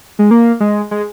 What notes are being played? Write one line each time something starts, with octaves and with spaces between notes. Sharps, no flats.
G#3
A#3
G#3
G#3